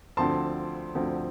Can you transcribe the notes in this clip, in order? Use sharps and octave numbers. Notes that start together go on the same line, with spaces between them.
D2 D3 F3 C4 A5 C6
D2 D3 F3 C4